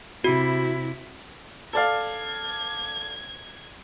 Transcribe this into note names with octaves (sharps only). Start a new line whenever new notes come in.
C3 E4 F#4
A4 D5 F5 G#6